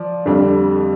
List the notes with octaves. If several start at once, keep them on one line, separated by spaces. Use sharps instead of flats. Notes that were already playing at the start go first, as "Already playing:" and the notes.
Already playing: F3 D5
F2 D3 G3 D4